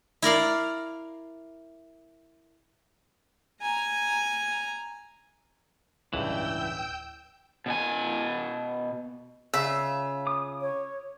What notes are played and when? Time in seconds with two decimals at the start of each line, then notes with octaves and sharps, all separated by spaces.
0.22 E4 A#4 D5 F5
3.62 G#5 A#5
6.14 D1 C#2 G2 E3 G5 E6 G6
7.66 B2 G#5
9.54 C#3 F4 E5
10.27 D6 D#6
10.61 C#5